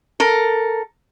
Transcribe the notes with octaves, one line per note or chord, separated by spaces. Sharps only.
A4 A#4